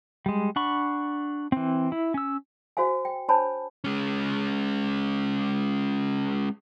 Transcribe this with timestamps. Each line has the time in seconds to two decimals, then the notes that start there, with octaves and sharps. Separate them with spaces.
0.26 G3 G#3
0.56 D4 F#5 B5 C#6
1.52 E3 C4
1.92 E4
2.14 C#4 E6
2.77 F#4 C5 F5 G#5
3.05 G5
3.29 D4 C5 C#5 G#5 A5 B5
3.84 G#3 C#4